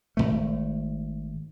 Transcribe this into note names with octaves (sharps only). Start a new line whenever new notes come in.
G#1 E2 A3